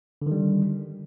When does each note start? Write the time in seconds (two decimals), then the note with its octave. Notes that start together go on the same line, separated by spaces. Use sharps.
0.22 D3
0.26 D#3
0.31 G3